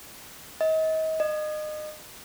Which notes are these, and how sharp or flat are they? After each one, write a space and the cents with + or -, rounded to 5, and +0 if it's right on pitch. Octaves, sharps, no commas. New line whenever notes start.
D#5 +35
D#5 -30